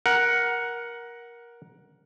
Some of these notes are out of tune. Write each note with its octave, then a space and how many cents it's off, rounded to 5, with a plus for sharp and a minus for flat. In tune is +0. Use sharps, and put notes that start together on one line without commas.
A#4 +15 F#5 +0